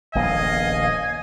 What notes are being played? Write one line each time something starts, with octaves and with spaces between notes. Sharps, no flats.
D#1 A#1 B3 D#5 F5 G#5